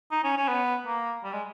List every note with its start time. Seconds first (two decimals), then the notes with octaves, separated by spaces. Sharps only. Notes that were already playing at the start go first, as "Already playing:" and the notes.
0.11 D#4
0.24 C#4
0.37 C#4
0.48 B3
0.86 A#3
1.24 G3
1.33 G#3